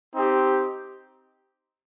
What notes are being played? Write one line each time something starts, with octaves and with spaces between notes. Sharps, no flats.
C4 D#4 G4